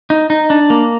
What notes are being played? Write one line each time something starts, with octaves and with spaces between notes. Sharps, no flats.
D#4
D#4
D4
A#3